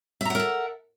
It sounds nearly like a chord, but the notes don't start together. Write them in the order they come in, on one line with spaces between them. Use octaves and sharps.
E5 A#5 F#5 A#4 A4